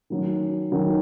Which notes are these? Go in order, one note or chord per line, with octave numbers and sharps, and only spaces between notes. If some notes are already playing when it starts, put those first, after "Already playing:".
D#3 F#3 C#4
D#3 F#3 C#4